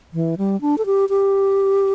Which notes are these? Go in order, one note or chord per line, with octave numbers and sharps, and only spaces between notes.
E3
G3
D4
A4
G4
G4